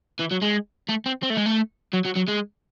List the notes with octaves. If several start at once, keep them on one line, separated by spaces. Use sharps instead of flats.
E3
F#3
G#3
A3
C4
C4
A3
G#3
A3
F#3
F#3
F#3
G#3